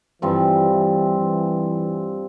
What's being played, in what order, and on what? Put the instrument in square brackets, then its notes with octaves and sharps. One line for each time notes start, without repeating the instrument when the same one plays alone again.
[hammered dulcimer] G2 F3 C4 [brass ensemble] E3
[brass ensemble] E3
E3